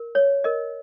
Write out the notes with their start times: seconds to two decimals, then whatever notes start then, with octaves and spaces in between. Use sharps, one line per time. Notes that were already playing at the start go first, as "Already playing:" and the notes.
Already playing: A#4
0.15 C#5
0.44 A#4 D#5